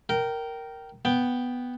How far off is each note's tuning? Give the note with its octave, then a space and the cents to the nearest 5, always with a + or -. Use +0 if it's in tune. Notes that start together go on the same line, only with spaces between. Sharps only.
A#4 -5 G5 -20
B3 +0 G5 +0